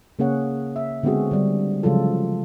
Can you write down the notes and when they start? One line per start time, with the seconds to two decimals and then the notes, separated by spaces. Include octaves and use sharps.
0.19 C#3 A#3 C#4 G#4 C#5 F#5
0.76 E5
1.03 D3 G#3 B3 C4 F#4 G#4
1.31 D3 G3
1.83 C#3 F3 F#3 G#3 F4 A4